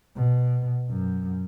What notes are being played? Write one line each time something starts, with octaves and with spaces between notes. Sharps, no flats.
B2
F#2